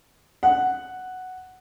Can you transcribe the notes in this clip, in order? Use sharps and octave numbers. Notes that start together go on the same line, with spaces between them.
F#5